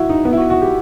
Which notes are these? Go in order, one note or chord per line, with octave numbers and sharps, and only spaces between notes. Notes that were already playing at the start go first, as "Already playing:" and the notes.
Already playing: E4 F#4
D#4
B3
E4
F#4
F#4
G4